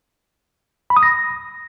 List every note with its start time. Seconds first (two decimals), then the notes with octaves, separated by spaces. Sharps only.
0.90 B5
0.96 D#6
1.03 A#6